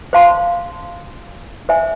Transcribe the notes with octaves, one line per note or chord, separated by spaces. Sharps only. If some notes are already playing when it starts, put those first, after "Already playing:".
C5 F5 A5 C6
C5 E5 G#5